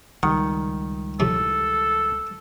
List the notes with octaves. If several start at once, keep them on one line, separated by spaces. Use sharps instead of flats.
C#2 D#3 G3 F#5
F2 A2 C3 A4